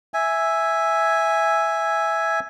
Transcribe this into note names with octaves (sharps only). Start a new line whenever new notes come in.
E5 G#5